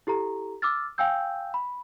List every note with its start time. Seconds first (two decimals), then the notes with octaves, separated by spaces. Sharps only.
0.07 E4 G4 A4 A#5
0.62 D6 E6 F6 A6
0.98 F5 G5 G#5 E6 G6
1.54 B5